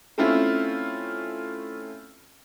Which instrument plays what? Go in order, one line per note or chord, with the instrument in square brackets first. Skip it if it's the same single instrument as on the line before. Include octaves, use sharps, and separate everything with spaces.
[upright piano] A3 C4 C#4 E4 F4